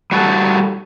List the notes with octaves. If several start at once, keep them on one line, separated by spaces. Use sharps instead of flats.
G3 F#4 A4